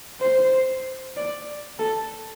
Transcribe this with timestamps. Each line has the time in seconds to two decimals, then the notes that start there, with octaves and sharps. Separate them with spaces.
0.21 C5
1.16 D5
1.79 A4